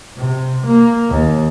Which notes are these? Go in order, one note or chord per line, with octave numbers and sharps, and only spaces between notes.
C3
A#3
D#2